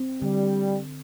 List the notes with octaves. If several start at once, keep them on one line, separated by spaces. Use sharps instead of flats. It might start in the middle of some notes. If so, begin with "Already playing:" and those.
Already playing: C4
D3 G3